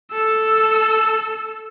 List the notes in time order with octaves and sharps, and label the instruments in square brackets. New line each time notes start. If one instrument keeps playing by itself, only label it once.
[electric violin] A4 E6